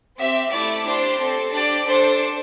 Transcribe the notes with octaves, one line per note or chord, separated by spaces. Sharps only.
C4 G4 E5
A3 E4 G4 D5
D4 G4 C5
C4 A4
D4 G4 D5
D4 A4 C5